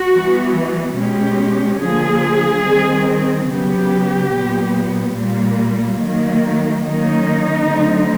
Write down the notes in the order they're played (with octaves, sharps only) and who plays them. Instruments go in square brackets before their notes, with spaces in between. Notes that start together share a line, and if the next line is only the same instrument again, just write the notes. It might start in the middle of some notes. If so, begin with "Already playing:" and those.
Already playing: [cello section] F#4
E3 G3 B3
B2 G#3 C#4 G4
D3 F3 A#3 G#4
D#3 G3 C4
C#3 F#3 B3 G4
A#2 F#3 B3
A#2 G3 A#3
D#3 F#3 A#3
D#3 F#3 A#3 C#4 D#4
D3 F#3 A3 C4